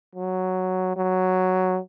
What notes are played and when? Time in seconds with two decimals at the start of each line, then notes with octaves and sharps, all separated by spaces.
0.15 F#3
0.97 F#3